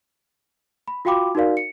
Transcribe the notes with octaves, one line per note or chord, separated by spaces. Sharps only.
B5
F4 F#4 F5 G5 B5 D6
D#4 F#4 A#4 D5 F5
C#7